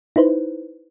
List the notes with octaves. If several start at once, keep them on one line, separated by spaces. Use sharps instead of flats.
D#4 E4 B4 C5